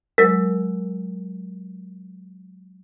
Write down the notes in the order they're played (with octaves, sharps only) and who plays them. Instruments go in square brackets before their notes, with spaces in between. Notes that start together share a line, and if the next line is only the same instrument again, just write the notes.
[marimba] F#3 G#3 [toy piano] A#4